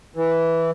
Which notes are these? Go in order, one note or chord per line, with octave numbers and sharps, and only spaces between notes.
E3